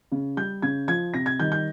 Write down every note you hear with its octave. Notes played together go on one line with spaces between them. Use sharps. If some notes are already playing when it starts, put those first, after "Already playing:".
C#3
G3 G6
C#3 G#6
F3 G#6
C3 A#6
G#6
D#3 G3 G6
G6